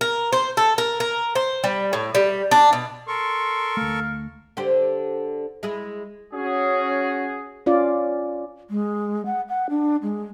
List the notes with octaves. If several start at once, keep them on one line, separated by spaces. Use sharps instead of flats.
A#4
C5
A4
A#4
A#4
C5
G3
A2
G3
D4
B2
A4 A#4 C6 C#6
D2 A3 F5
D3 G4 C5
G#3 E4 G#4
C#4 F#4 G#4
C#4 F4 D5
G#3
F#5
F#5
D4
G#3